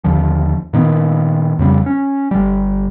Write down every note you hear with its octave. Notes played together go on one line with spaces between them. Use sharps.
D#2 D3 F3
A#2 D#3 B3
F2 C#3 G3
C#4
G1 G3